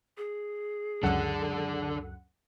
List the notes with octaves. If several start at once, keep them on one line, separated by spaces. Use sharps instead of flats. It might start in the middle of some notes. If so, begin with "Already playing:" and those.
G#4
C#2 F#2 D4 A4 F#5